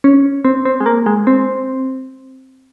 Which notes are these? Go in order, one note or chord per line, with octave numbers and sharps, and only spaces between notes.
C#4
C4
C4
G#3
A#3
G#3
C4